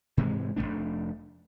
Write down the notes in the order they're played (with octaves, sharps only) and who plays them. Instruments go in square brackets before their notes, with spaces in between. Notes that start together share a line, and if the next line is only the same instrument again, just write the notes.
[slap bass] G#2 C3 E3 G#3
F1 A2 A3 D4